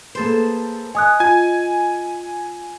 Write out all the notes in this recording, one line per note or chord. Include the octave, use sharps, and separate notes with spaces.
A#3 G#4 A4 B4 C5
C#5 D#5 G#5 D#6 F#6
F4 G#5 G#6